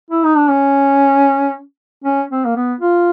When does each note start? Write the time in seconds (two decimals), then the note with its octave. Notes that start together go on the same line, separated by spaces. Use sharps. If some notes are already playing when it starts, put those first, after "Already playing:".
0.10 E4
0.24 D#4
0.36 D4
0.50 C#4
2.04 C#4
2.30 C4
2.45 A#3
2.56 B3
2.81 F4